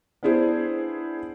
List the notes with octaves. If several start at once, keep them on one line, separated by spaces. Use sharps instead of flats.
B3 D4 E4 G#4 C5